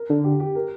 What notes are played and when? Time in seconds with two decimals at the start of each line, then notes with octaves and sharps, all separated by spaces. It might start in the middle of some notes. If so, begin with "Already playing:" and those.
Already playing: A#4
0.09 D3
0.24 G4
0.40 G4
0.55 A#4